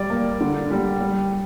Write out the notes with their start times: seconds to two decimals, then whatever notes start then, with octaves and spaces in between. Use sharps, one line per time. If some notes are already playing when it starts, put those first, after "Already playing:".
Already playing: G3 D5
0.10 A#3
0.40 D3
0.71 G3
1.01 G3